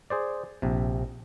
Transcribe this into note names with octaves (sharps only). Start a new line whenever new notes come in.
G#4 C5 D5
A#1 C3